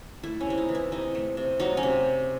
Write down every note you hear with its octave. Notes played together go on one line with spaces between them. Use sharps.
A3 E4
C#4
C3 E4
D#4
E3
E4
C3 D#4
A3
C3
F#3 D#4
C#4
C3